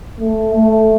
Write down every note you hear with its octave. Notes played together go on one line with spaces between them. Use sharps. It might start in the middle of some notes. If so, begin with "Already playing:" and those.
A3
A3